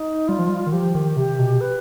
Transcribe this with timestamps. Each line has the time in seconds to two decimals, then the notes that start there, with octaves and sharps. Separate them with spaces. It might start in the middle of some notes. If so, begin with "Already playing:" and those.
Already playing: D#4
0.28 G3 F4
0.39 F3
0.49 G3
0.67 D#3
0.72 F3 G4
0.95 D#3
1.17 C3 G4
1.39 B2
1.61 B4